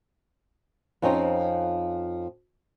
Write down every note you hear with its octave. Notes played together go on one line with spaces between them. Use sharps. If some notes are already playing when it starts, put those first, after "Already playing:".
F2 F3 C4 C#4 D#4